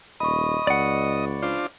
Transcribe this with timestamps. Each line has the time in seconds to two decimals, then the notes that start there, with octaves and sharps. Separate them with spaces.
0.20 D#1 D#5 B5 C#6
0.67 C#2 D5 F#5
1.43 D4 F4 C5